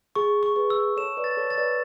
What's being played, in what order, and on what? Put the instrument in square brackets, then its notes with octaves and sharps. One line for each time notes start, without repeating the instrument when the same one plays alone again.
[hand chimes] G#4 [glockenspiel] C#6
[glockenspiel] C#6
[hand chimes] G#4 B4
[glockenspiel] E6
[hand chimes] A4 C#5 [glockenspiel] E7
[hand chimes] B4 D5
[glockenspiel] A6
[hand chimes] A4 C#5
[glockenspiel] A6
[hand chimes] B4 D5